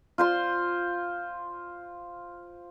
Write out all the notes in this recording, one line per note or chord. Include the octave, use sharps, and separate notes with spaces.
F4 C5 C6